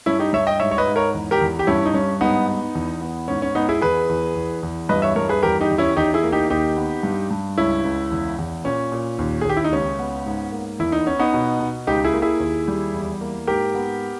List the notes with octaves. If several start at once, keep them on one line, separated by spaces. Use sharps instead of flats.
G2 C#4 E4
D#4 G4
G2 C#5 E5
D#5 G5
G#2 C#5 E5
C#5
B4 D#5
G#2
A#4 C#5
E2
G4 A#4
E2
G4
G2 C#4 E4
D#4
G2 C#4
G#2 B3 D#4
B3
E2
B3
G#2 C#4
C#4
G#2 B3 D#4
E4 G#4
E2 G#4 B4
E2
E2
E2
G2 B4 D#5
C#5 E5
G2 A#4 C#5
G#4 B4
E2 G4 A#4
D#4 G4
E2
C#4 E4
E2 D#4 G4
E4 G#4
A#3
D#4 G4
D#2 D#4 G4
B3
G2
G2
C#2 C#4 E4
C#2
E2
E2
A#2 C#4
A#2
D#2
G#4
D#2 G4
E4
D#4
C#2 C#4
B3
G#2
A#3
E2 E4
D#4
B3 C#4
B3 D#4
B2
B2
C#2 D#4 G4
E4 G#4
A#3
E4 G#4
D#2
G3
E2
A#3
G#2 G4 A#4
B3